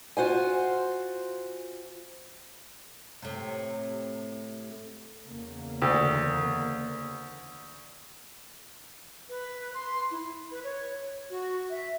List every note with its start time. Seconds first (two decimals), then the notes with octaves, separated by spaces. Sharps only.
0.17 F4 F#4 C5 G#5
3.22 A2 C3
5.26 E2 C#3 A#3
5.82 D2
9.29 B4
9.74 C6
10.11 E4
10.51 B4
10.64 C#5
11.30 F#4
11.70 E5